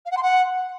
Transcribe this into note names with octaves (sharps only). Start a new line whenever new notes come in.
F5
F#5
C6
F#5